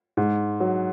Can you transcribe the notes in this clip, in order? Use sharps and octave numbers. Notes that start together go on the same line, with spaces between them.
G#2
F#3